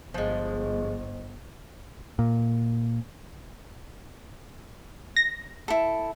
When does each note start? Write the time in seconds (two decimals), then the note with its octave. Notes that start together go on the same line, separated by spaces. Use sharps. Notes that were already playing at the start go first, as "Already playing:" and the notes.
0.14 G1 F3 G#3 C5 D#5
2.19 A#2
5.16 A#6
5.68 E4 A4